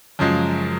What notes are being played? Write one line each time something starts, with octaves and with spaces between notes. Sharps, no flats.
F#2 C#3 F3 G#3